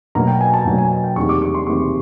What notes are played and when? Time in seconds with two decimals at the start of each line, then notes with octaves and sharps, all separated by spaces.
0.15 B2 F#3 A#3 A#5
0.27 G5
0.41 G#5
0.54 A5
0.65 B2 F#3 A#3
0.78 G#5
0.92 G#5
1.04 G5
1.16 E2 C3 D#3 G3 A#3 C#6
1.29 D6
1.42 C#6
1.54 C6
1.67 E2 C3 D#3 G3 A#3 C#6